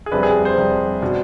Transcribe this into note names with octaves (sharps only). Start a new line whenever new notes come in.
G#4
F2 C3 G3 D4 B4
G#4
C5
F2 C3 G3 D4
B2 B3 D4